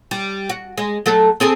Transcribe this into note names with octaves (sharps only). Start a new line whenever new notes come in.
G3
F#4
G#3
F#3 A3 A4
C4 G#4 A4